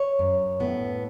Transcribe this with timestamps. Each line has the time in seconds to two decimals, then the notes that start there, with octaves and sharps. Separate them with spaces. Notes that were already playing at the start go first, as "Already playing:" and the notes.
Already playing: C#5
0.19 F#2
0.60 A2 B3